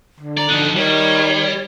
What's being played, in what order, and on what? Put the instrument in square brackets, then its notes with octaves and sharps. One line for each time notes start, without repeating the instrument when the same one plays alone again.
[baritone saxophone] D3
[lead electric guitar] D5 [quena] A#5
[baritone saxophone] D3 [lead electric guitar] F3 D#4 [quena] F#6
[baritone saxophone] D#3 [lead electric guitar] G3 [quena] C#5